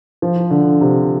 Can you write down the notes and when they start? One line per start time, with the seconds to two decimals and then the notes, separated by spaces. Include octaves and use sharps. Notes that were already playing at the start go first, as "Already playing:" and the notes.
0.22 F3
0.50 D3
0.81 C3